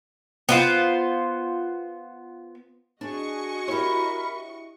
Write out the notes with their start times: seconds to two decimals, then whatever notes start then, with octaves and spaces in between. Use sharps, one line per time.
0.49 B3 F4 C5
3.01 D4 F#4 G#4 D#5 G#5 C#6
3.68 E4 G4 A#4 C#5 B5